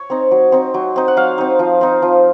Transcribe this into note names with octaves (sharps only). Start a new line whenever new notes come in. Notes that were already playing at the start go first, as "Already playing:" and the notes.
Already playing: C#5
C4 D#4
F#3
C4 D#4
F#3
C4 D#4
F#5
F#3 F5
C4 D#4
F3
C4 D#4
F3